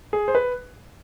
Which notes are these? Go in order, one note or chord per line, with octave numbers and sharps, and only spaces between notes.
G#4
C5
B4